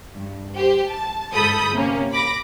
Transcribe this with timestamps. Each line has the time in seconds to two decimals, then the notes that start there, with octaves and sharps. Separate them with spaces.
0.18 G2
0.58 G4 C5
0.90 A5
1.34 G1 G#2 A4 B5 D#6 G6
1.73 C3 A#3 C#4
2.12 B5 D6 A#6